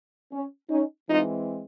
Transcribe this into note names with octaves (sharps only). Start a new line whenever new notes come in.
C#4
C#4 D#4
E3 G#3 C4 D#4 F4